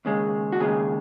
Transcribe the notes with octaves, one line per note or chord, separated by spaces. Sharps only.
D#2 C#3 G#3
F#4
D#2 C#3 G#3 G#4